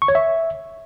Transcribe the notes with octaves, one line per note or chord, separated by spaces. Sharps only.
C#6
C#5
E5